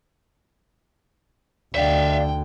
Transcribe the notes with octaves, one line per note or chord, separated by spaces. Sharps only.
D2 D3 D5 E5 F5 G5